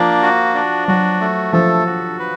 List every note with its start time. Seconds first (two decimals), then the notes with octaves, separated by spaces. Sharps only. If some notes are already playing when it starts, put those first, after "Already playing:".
Already playing: F3 A#3 D4
0.22 F#4
0.54 D4
0.88 F#3 F#4
1.21 A3
1.53 F3 A4
1.86 F#4
2.20 B4